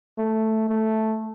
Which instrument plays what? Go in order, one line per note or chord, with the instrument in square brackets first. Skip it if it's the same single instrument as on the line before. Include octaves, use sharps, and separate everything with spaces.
[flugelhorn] A3
A3